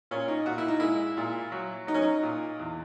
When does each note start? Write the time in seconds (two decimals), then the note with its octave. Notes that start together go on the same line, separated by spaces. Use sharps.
0.11 A#2 C#4
0.28 D#4
0.46 A#2 F#4
0.58 E4
0.68 D#4
0.80 G#3 E4
1.17 A#2
1.52 F#3
1.87 F#3 D#4
1.94 C#4
2.02 D#4
2.23 A#2
2.59 E2